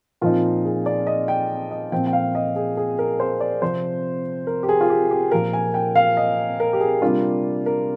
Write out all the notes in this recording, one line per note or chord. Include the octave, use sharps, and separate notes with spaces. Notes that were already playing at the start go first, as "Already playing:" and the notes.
A#2 F3 C4 D#4 F4
G#4
D5
D#5
G5
D#5
A#2 F3 C4 G5
G5
F5
D#5
G#4
G#4
A#4
C5
D5
C3 F3 C4 C5
A#4
G4
G#4
F4
G4
G4
A#2 F3 A#3 A#4
G#5
G5
F5
D#5
A#4
G4
G#4
C3 G3 A#3 D4 F4
A#4